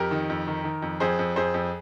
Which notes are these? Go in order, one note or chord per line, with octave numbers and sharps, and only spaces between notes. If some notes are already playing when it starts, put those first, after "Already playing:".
Already playing: F2 G4 A#4
D#3
F2
D#3
D#3
F2
F2 G#4 C5
F2
F2 G#4 C5
F2